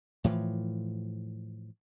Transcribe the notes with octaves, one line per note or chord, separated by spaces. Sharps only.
A2 E3 F3